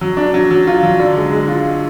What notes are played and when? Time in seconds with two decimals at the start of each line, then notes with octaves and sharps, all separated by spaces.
0.01 F#3
0.17 D4
0.34 F#3
0.51 F#3
0.67 F4
0.83 F#3
1.00 D3
1.16 G#3
1.32 G#3
1.48 F4
1.65 G#3